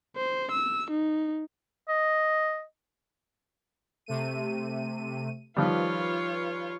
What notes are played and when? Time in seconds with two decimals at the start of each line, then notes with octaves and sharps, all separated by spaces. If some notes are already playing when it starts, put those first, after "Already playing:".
0.16 C5
0.51 E6
0.91 D#4
1.89 D#5
4.06 C3 A3 D#7
5.57 D#3 F3 G3 F4 B4 C#5